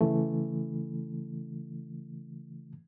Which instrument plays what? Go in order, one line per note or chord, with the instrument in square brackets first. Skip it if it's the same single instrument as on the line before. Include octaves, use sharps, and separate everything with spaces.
[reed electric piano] C#3 E3 A3